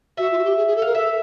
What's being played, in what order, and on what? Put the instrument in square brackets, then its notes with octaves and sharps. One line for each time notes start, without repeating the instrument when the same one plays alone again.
[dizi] F#4 [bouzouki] E5
[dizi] F4
F#4
G4
G#4
G#4
A4
[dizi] A#4 [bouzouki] F5
[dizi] A4 [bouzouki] E5